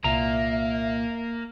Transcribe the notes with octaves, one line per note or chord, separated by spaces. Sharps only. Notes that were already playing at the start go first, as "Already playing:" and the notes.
C2 A#2 A#3 E5 A#5